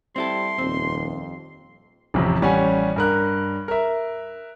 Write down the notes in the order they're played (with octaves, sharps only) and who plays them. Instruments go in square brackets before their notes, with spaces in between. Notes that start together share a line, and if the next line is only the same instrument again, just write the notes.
[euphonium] G3 [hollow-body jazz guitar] C4 E4 A4 [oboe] C6
[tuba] D#1 [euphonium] F2 [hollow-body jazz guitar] C4
[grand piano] A1 F2 C3
A1 G3 C#4 F#5 G#5
G2 A#4 F#6
A#4 E5